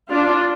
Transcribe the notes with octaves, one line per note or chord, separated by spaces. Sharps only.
D4 F4